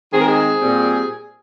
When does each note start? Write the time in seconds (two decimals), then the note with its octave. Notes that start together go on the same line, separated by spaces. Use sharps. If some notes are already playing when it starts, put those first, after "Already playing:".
0.12 D#3 G#3 C4 G#4
0.20 A#4
0.28 G#4
0.61 A#2 G3 C4